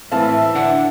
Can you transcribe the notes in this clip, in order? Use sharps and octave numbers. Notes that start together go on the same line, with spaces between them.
A2 E3 C4 E4 A4 E5 F5
D3 D4 F#5